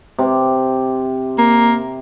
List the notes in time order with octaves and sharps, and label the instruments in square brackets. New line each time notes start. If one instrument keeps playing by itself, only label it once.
[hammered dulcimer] C3
[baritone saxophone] A#3